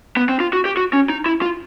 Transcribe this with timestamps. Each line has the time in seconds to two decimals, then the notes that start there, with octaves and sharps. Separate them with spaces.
0.17 B3
0.29 C4
0.40 F4
0.53 F#4
0.65 G4
0.77 F#4
0.93 C#4
1.09 D#4
1.26 E4
1.42 F4